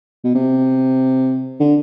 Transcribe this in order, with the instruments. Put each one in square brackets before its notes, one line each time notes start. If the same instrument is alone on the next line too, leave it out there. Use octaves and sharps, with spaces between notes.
[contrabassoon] B2
C3
D3